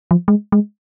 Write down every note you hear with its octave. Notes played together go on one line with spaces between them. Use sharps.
F3
G#3
G#3